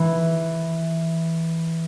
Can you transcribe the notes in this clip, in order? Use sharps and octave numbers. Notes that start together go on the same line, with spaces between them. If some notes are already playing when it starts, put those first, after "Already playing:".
Already playing: E3